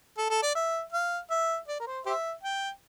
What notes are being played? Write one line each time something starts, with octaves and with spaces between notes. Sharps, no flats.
A4
A4
D5
E5
F5
E5
D5
A#4
C5
G4 C5 E5
G5